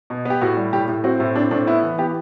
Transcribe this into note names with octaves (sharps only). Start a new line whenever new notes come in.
B2
B3 G4
A2 F#4
G3
A2 G4
A2
C4 F#4
A2 E4
C4 D4
A2 D4
B3 E4
E3
B3 G4